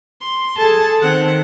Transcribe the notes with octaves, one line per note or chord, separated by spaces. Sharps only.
C6
G#4 A4 A5
D#3 C4 F#5